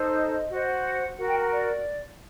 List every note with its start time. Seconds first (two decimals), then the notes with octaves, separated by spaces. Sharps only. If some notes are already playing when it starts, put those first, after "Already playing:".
Already playing: D#4 A4 C5
0.14 D#5
0.49 F#4 C5
0.82 F#5
1.16 F#4 A#4 F#5
1.27 G5
1.38 A#5
1.50 D5